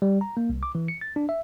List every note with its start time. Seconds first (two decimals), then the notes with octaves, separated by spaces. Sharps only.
0.02 G3
0.21 A#5
0.37 A#3
0.49 C2
0.63 D6
0.75 E3
0.88 C#7
1.01 A6
1.16 D4
1.29 E5